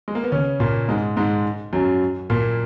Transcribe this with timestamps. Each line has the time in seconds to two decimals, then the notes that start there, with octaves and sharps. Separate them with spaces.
0.08 G#3
0.15 A#3
0.23 B3
0.32 C#3 C#4
0.60 A#2 A#3
0.88 G#2 G#3
1.17 G#2 G#3
1.73 F#2 F#3
2.30 A#2 A#3